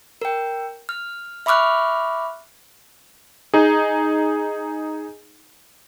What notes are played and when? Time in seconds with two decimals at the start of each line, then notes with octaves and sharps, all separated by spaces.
0.22 A#4 G5
0.89 F6
1.46 E5 B5 C#6 D6 F6 F#6
3.54 D#4 G#4